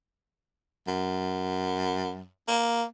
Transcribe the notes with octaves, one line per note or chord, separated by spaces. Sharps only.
F#2
A#3